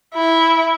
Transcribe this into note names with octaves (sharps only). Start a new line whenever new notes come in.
E4